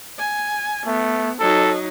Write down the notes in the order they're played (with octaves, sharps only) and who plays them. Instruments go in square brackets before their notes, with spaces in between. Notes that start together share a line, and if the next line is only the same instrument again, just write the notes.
[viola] G#5
[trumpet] A3 [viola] B3
[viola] F#3 D#4 [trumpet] A4